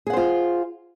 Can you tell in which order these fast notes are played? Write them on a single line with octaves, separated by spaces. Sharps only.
G#4 F#5 C5 F4